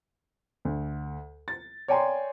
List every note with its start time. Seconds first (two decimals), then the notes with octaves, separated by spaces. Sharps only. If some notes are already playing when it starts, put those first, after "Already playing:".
0.65 D2
1.48 A6
1.88 C#5 D5 G5 G#5 A#5 C6